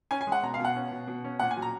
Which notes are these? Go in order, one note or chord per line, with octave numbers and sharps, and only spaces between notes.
C#4 G#5
G#5
G#3
F#5
B2 A#5
F5
B2
F#5
C#4
B2
B2
C#4
A#2 F#5
G#5
F#3
A#5